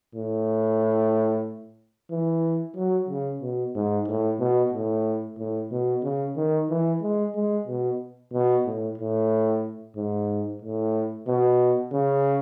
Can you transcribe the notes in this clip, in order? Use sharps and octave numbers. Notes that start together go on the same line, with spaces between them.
A2
E3
F#3
C#3
B2
G#2
A2
B2
A2
A2
B2
C#3
D#3
E3
G#3
G#3
B2
B2
A2
A2
G#2
A2
B2
C#3